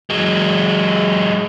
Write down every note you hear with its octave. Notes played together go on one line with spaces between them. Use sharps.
F#3 G#3